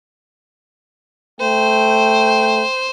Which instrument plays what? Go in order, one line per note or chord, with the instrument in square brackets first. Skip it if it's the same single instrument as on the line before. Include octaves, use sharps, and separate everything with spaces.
[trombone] A3 [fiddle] C5 [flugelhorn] G5